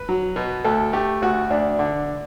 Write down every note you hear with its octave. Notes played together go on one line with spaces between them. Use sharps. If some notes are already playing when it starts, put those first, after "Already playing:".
Already playing: B4
F#3
B2
D2 A4
A3 G4
D2 F#4
D2 D4
D3